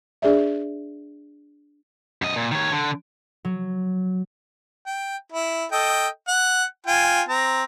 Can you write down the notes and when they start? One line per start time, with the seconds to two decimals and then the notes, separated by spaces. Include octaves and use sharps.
0.22 D4 G#4 D5 E5
2.22 F#2 D#5
2.36 A#2
2.52 D#3 C#5
2.72 D3
3.45 F#3
4.86 G5
5.32 E4
5.72 A4 D#5 G5
6.28 F#5
6.86 F4 G5 G#5
7.28 C4 A#5